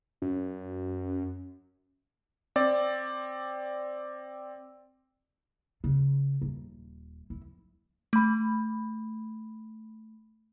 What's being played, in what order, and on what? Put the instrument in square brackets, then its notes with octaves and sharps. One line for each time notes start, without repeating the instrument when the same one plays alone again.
[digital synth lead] F#2
[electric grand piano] C4 D5
[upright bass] C#3
D#1
E4
[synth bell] A3 B5